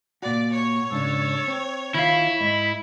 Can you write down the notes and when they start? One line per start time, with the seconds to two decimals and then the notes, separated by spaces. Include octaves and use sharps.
0.22 A#2 F#4 D5
0.52 C#5 C#6
0.91 G#2 C#3 D4 A4
1.48 C4
1.94 D#3 E4 F4 F5 B5
2.40 G#2 D#5